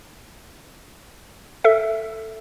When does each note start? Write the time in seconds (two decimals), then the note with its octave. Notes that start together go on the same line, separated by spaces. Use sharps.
1.64 A4 E5